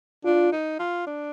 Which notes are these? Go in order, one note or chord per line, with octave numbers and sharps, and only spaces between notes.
D4 F4
D#4
F4
D4